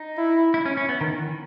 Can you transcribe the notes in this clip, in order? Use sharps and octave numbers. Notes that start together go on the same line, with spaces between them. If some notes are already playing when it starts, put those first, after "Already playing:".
Already playing: D#4
E4
E4
C#4
C#4
B3
D#3
E3